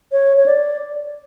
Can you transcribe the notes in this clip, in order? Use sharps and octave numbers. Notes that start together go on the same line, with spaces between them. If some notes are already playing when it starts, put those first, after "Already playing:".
C#5
C#5
D5